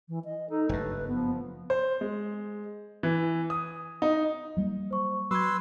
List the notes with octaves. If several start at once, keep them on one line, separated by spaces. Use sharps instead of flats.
E3
D#5
D#4 A4
F#1 G2 A3 B4
F3 B3
C5
G#3
E3
D#6
D#4
F#3 G3 A#3
C5 C#6
F#3 B4 C6 E6 G#6 C7